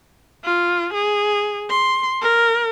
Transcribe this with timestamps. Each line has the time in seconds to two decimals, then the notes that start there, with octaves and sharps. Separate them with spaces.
0.45 F4
0.94 G#4
1.70 C6
2.21 A#4